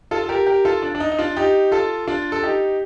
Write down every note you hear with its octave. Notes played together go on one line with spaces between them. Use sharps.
F4 A4
A4
G4 A#4
G4 A#4
F4 A4
D4
D4
D#4
D#4
D4 F4
D#4 G4
F4 A4
D4 F4
A4
D#4 G4